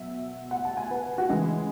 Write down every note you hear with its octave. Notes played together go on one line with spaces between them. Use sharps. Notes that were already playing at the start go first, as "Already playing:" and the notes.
Already playing: B2 F#3 E5
F#5
A5
G#5
B4
F#4
C#3 E3 G#3 G#4